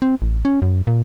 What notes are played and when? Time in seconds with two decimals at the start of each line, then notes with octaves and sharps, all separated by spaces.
0.02 C4
0.22 A1
0.45 C#4
0.62 F#2
0.87 A#2